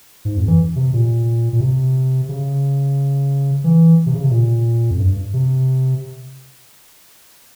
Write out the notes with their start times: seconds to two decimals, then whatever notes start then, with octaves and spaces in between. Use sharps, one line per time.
0.25 G#2
0.37 F2
0.48 E3
0.76 C3
0.93 A#2
1.53 A#2
1.60 C3
2.29 C#3
3.64 E3
4.06 C3
4.14 C#3
4.23 C3
4.31 A#2
4.91 F2
4.99 G2
5.34 C3